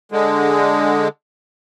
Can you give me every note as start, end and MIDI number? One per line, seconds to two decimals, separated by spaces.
0.12 1.08 50
0.12 1.08 56